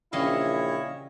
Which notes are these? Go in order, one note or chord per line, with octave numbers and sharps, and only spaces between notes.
A#1 C#3 E3 G3 E4 C#5 D#5 F5